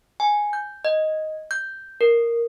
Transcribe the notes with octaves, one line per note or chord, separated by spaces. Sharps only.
G#5
G6
D#5
G6
A#4